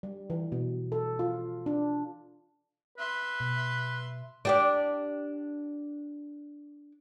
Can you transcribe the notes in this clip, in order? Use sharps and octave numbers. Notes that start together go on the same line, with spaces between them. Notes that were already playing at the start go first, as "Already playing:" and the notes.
G3
E3
B2
A4
F4
D4
B4 E5 C6
B2
D4 G4 D5